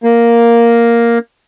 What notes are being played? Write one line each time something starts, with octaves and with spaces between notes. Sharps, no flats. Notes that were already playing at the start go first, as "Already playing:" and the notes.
A#3